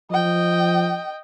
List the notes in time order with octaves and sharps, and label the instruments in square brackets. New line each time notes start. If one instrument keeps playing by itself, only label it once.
[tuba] F3 [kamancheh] D#5 G5